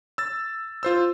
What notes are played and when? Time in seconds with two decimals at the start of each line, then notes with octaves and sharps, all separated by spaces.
0.18 E6 A6
0.83 F4 C5 E6